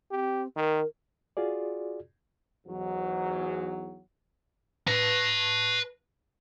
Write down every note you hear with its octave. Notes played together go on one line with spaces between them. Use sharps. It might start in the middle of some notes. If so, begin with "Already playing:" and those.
C4 G4
D#3 A#4
F4 F#4 G#4 D5
E2 G#2 F#3
B4 A5